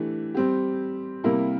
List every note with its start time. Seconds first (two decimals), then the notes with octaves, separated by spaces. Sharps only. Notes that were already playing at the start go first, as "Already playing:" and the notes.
Already playing: E3 A3 D4 G4
0.34 G3 C4 G4
1.24 C3 G3 A#3 E4 A#4